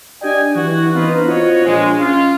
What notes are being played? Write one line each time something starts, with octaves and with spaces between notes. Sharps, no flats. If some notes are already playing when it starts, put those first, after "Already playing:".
D4 G4 D5 D#5 G5 G#5
E3 F#4
B3 C4 D4 D#4 F4 B4
F4 F#4 C5 C#5 D#5 F#5
A#1 G#3
C#4 F4